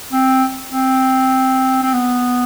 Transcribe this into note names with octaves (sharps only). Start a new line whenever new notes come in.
C4
C4
C4
B3